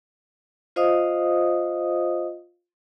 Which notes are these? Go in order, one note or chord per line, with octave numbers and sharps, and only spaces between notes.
F4 C5 D#5 F5 D#6